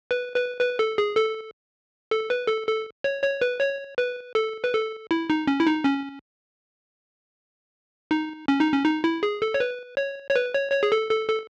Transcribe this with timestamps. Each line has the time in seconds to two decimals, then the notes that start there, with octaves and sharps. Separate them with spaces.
0.11 B4
0.36 B4
0.61 B4
0.79 A4
0.98 G#4
1.17 A4
2.11 A4
2.30 B4
2.48 A4
2.67 A4
3.04 C#5
3.23 C#5
3.41 B4
3.61 C#5
3.98 B4
4.35 A4
4.64 B4
4.73 A4
5.11 E4
5.30 D#4
5.47 C#4
5.60 E4
5.67 D#4
5.85 C#4
8.11 D#4
8.48 C#4
8.60 D#4
8.72 C#4
8.85 D#4
9.04 E4
9.23 G#4
9.42 A4
9.54 C#5
9.60 B4
9.97 C#5
10.30 C#5
10.36 B4
10.54 C#5
10.72 C#5
10.83 G#4
10.92 A4
11.10 A4
11.29 A4